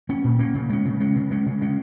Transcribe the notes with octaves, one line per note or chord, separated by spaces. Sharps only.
A#3 C#4
A#2
A#3 C#4
C#3
G#3 C#4
C#3
G#3 C#4
C#3
G#3 C#4
C#3
G#3 C#4